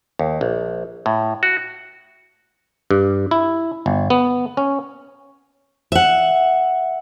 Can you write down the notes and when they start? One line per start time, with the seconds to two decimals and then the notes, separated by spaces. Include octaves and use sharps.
0.19 D#2
0.41 A#1
1.06 A2
1.43 F#4
2.91 G2
3.31 E4
3.86 G1
4.10 B3
4.57 C#4
5.92 E5 F#5